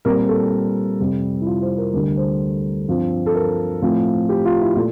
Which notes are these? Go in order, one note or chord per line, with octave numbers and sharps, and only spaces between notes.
A#2 G3 C4 A#4
A4
F2 C3 G3 C4
E4
F4
C5
A#4
D2 D3 G3 A#4
C5
G2 F3 C4
A4
A#4
A2 F3 C4
G4
F4
E4
A#2 A3 F4